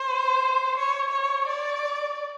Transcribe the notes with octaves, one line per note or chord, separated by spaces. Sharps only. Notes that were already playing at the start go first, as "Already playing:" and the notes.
Already playing: C5
C#5
C#5
D5